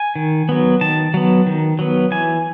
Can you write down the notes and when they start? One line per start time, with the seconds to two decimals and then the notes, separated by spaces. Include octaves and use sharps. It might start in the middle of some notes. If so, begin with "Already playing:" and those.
Already playing: G#5
0.16 D#3
0.49 F#3 B3
0.81 D#3 A5
1.14 F#3 B3
1.47 D#3
1.79 F#3 B3
2.11 E3 G#5